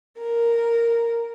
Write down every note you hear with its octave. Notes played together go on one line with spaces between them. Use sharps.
A#4